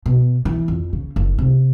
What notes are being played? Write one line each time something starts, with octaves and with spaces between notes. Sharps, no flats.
B2
E3
F2
C#3
F#1
C3